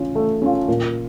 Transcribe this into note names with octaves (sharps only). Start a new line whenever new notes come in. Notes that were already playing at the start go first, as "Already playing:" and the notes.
Already playing: C#4 F4
A3
C#4 F4
A#2